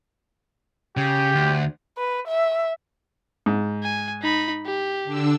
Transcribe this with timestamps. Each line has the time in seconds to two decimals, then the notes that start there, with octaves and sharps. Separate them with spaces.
0.97 C#3 G4
1.35 D2
1.98 B4
2.27 E5
3.46 G#2
3.83 G#5
4.22 D#4 B5
4.65 G4
5.05 D3 D4 E6